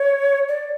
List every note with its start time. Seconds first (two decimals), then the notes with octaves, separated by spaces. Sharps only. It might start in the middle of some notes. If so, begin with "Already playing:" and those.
Already playing: C#5
0.49 D5